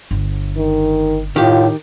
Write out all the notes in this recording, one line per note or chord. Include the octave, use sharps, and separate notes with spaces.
G1
D#3
A2 D#3 F4 G4